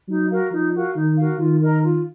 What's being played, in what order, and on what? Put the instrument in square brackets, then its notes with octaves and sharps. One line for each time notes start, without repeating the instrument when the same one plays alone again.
[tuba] F#3 [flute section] D#4
[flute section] F#4 A#4 F5
[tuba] F3 [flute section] D#4
[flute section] F#4 A#4 F5
[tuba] D#3 [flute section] D#4
[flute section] F#4 A#4 F5
[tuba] D#3 [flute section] F4
[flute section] A#4 D#5 A#5
F4